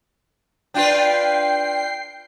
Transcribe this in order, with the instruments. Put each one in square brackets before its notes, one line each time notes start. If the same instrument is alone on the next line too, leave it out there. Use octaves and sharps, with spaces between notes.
[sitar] D4 F4 B4 [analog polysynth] G5 C7